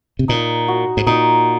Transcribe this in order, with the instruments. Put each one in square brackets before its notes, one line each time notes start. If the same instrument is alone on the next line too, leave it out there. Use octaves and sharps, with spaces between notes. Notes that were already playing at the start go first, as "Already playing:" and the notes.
[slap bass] C3
[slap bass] A#2 [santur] D#4
[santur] F#4
[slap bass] G#2
[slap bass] A#2 [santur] D#4